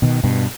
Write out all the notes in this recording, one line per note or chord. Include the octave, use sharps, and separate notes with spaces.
B2 D#3
G2 B2